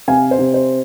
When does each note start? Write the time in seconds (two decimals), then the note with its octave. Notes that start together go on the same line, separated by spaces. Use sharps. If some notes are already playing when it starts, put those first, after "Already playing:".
0.08 C3 F5 G#5
0.31 C5
0.39 C3
0.54 C5